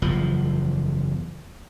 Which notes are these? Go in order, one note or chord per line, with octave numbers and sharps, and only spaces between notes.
F#1 E2 F3